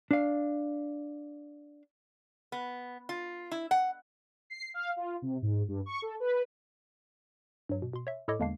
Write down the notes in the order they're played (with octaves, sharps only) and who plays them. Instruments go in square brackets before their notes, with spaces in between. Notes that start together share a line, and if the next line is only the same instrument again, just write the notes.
[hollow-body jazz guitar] D4 F5
[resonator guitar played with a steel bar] B3
F4
E4
F#5
[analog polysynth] C7
F5
F4
C3
G#2
G2
C#6
A4
B4
[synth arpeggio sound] G2 F#3
B2
B2 C6
C#5 E5
A2 E4 A4 C#5 D#5 D6
E2 D3 G#3 A#3 D4 C7